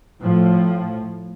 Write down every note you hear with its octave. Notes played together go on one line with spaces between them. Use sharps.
A2 F3